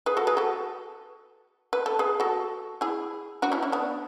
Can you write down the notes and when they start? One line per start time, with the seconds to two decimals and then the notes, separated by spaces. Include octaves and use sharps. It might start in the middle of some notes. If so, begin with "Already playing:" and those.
0.06 G#4 B4
0.17 F#4 A4
0.27 G#4 B4
0.37 F#4 A4
1.73 B4
1.86 A4
1.99 G#4 B4
2.20 F#4 A4
2.81 E4 G#4
3.42 D4 F#4
3.52 C#4 E4
3.63 C#4 E4
3.72 B3 D4